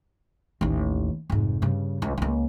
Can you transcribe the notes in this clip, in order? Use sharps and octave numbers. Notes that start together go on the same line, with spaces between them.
A1 D#2
F1 G#2
G2 C#3
C#2
C#2 A#3